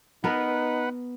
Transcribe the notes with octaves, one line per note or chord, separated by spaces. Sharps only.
B3 D#4 A#4 B4 F#5